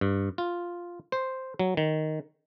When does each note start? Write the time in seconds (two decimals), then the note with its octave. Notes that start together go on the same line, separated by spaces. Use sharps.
0.01 G2
0.38 F4
1.12 C5
1.59 F#3
1.77 D#3